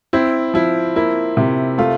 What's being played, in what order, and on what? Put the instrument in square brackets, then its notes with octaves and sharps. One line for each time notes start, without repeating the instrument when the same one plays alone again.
[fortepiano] C4 [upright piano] E4
[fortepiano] F3 [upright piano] E4
[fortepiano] A#3 [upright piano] E4
[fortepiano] C3
[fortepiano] A3 [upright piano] F4